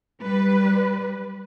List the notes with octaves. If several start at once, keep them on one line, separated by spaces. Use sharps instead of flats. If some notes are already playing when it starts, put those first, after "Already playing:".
G3 B4